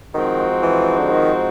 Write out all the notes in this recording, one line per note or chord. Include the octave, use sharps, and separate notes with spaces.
D#3 F3 G#3 C4 D#4 F#4
E3
D3
D#3